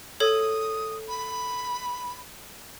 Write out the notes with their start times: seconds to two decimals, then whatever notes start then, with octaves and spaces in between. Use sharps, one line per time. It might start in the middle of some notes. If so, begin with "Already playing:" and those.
0.20 A4 C#5 D#6
1.08 B5